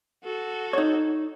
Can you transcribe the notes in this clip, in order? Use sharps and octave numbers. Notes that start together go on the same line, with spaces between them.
F#4 A4
D#4 C#5